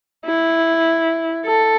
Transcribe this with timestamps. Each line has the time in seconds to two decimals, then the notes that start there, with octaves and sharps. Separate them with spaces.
0.26 E4
1.46 A4